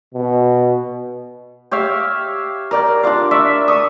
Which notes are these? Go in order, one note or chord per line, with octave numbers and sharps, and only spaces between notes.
B2
G4 C#5 E5 F5
A#4 D5 G5
D4 F4 D5 F5
D5 E5 C#6
C#6 D#6